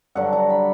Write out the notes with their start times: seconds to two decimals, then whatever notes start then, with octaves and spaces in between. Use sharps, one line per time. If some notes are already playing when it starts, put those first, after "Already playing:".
0.15 G2 D3 F#3 F#5
0.33 A#5
0.50 B5